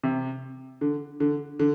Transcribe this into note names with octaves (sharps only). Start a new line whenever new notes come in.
C3
D3
D3
D3